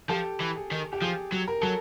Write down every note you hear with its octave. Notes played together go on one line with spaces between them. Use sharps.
F3 G4 A4
E3
G#4
D#3
G4
F3 G#4
F#3
A#4
F#3 A4